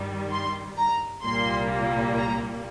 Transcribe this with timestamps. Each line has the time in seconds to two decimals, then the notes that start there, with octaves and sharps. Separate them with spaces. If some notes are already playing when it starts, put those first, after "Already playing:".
Already playing: G2 D#3 G3
0.32 C6
0.78 A#5
1.24 C2 A#2 G3 A#3 C6
2.17 A#5